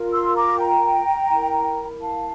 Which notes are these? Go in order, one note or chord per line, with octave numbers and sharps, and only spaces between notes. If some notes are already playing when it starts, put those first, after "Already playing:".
Already playing: F4 A#4
C6 E6
A#5 D6
G5 A#5
E4 A#4
F5 A5